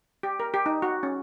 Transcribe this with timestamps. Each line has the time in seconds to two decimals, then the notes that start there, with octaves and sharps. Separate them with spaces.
0.23 G4
0.40 A#4
0.54 G4
0.66 D#4
0.82 F#4
1.03 C#4